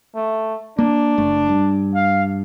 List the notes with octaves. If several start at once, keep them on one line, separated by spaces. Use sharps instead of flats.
A3
A#3 D4
F#1 A3
G2
F5